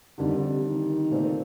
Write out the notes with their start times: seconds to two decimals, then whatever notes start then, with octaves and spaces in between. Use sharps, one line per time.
0.18 F2 D3 D#3 G3
0.30 C3
0.42 C3
0.53 C3
0.64 D#3
1.11 A#2 A3 C4